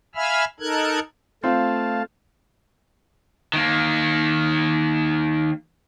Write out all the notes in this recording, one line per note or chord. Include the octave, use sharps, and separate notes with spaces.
E5 F5 G#5 B5 E6 F6
D#4 A4 A#4 F#6 G#6
A3 C4 F4 F5 A5
D#3 A#3